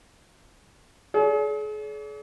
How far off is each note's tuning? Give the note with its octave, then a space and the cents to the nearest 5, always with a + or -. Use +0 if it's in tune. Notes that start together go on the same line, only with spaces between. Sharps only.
G#4 +40 D5 -45